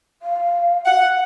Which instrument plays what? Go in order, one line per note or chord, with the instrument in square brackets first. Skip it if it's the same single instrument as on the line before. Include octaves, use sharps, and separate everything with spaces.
[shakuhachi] F5
[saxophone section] F#5